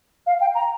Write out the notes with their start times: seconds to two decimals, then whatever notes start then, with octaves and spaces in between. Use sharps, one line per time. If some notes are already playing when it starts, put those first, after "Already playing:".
0.27 F5
0.41 G5
0.55 A#5